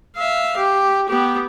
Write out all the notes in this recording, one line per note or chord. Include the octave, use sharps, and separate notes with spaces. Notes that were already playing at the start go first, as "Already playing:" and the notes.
E5 F5
G4
B3 G4